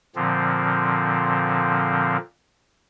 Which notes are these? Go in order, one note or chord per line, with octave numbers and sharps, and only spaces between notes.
A#2 D3 F3 C4